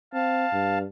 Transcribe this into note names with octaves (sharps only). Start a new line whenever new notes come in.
C4 F5 A5
G2